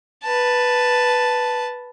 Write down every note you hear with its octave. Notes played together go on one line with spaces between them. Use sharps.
B4 A5